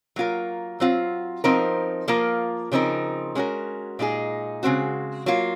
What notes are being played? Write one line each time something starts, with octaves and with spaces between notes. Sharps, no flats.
F#3 A#3 F4 A#4
F#3 C4 F4
F3 C4 D#4 A#4
F3 A#3 F4 A#4
C#3 F3 C4 D#4 A#4
G#3 C#4 F#4 A#4
A#2 G#3 D#4 G#4
C#3 G#3 C4 F#4
F#3 A#3 F4